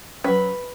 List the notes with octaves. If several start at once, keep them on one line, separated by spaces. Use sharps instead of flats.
F#3 C#4 B4